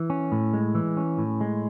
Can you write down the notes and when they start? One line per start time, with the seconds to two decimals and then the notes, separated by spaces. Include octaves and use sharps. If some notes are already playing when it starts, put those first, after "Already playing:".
Already playing: E3
0.10 C#4
0.32 A2
0.54 G#3
0.75 E3
0.97 C#4
1.18 A2
1.41 G#3